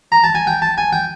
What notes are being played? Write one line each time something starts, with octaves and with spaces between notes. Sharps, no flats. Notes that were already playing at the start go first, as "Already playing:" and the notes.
A#5
A5
G#5
G5
A5
G#5
G5